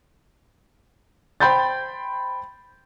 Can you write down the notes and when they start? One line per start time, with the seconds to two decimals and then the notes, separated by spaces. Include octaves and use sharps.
1.40 C5 G5 B5 C6 G6 A6